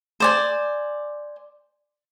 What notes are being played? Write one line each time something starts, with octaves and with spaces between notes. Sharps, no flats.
C5 D5 G#5